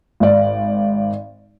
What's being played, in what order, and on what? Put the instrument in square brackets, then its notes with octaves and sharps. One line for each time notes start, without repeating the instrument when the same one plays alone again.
[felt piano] G#1 D5